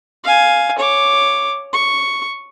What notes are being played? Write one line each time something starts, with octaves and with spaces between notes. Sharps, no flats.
F5 G#5
C#5 D6
C#6